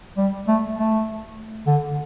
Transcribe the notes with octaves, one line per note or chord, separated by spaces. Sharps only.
G3
A3
A3
D3